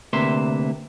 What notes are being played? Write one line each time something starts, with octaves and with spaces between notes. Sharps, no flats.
D2 C3 A#3 B4 E5 C6